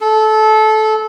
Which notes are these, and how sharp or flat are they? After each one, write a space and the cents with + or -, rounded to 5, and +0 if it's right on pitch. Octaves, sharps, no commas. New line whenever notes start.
A4 -20